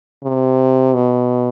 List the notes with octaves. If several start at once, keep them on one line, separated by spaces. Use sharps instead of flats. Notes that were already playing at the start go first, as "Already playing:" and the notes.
C3
B2